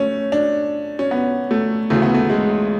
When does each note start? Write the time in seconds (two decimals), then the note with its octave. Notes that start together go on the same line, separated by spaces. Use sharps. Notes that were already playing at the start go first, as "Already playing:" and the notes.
Already playing: A3 C#4
0.32 D4
0.99 C#4
1.11 B3
1.51 A3
1.90 D2 C#3 E3 A3
2.02 B3
2.15 A3
2.30 G#3